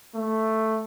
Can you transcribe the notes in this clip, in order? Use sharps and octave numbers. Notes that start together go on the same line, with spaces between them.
A3